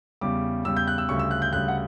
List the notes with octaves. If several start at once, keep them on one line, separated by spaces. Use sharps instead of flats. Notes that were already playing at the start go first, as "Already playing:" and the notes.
E2 C#3 G3 D6
E2 C#3 G3 E6
G6
F#6
E6
D2 C#3 G3 C#6
E6
F#6
G6
D2 C#3 G3 F#6
F#5